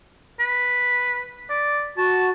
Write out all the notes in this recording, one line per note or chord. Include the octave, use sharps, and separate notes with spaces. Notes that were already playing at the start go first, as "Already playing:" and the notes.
B4
D5
F#4 A5